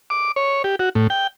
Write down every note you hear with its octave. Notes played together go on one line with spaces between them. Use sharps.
D6
C#5
G4
F#4
A2
G5